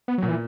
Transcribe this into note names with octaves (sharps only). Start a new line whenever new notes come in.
B3
F#3
A#2
E3